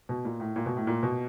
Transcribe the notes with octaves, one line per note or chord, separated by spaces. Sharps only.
B2
A#2
A2
A#2
B2
A2
A#2
B2